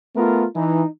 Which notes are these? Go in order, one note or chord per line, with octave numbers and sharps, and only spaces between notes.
A3 B3 F4 A#4
E3 D#4